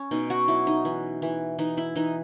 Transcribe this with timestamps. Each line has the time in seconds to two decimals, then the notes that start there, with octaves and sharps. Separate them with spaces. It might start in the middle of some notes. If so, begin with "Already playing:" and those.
Already playing: C#4
0.11 B2 D#4
0.30 F#4
0.48 F#3 E4
0.67 D#4
0.85 E3
1.22 E3
1.59 E3 D#4
1.77 E4
1.96 E3 D#4